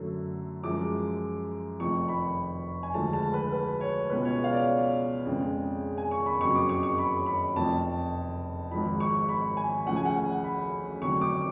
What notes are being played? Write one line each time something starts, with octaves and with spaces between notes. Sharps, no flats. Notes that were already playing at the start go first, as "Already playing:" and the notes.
Already playing: F#2 D3 F#3 A3
F#2 F3 G#3 D6
F1 F2 F3 C#6
B5
G#5
D2 D3 F3 G#3 A5
A5
B4
B4
C#5
C#2 B2 G#3 B4
C#5
F5
D5
F2 C#3 G#3
G#5
C#6
B5
F#1 F2 C#3 F#3 C#6
D6
C#6
C#6
B5
B5
F1 F2 F3 A5
G#1 G#2 F3 B5
C#6
B5
G#5
D2 C#3 F3 F#5
G#5
F#5
B5
F1 F2 D3 F#3 C#6
D6